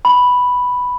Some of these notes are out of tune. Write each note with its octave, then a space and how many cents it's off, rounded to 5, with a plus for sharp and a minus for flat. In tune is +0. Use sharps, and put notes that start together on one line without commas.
B5 +0